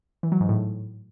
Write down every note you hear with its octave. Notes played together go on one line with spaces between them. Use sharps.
E3
F#3
G#2
A2